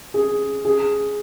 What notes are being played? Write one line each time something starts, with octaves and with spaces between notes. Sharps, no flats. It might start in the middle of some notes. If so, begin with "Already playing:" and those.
G#4
G#4